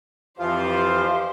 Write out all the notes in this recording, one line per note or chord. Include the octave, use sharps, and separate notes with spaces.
F2 E3 F3 F4 G4 C5 F5 C6